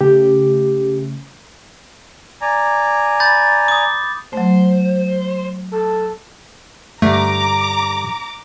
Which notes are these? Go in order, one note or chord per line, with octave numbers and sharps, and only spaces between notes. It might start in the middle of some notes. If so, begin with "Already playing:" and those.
C#3 A3 G4
D5 G#5 A#5
B5 G6 A6
D6 D#6
F#3 A3 C5
A4
G2 D3 A3 A#5 D6